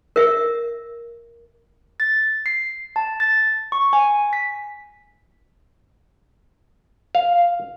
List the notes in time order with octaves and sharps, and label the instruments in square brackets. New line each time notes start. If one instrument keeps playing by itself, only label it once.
[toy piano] A#4 E5
[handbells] A6
C7
A5
A6
C#6
G#5
B6
[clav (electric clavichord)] F5